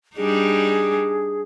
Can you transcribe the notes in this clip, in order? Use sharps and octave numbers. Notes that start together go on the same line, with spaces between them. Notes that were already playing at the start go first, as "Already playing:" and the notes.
G3 D4 D#4 G#4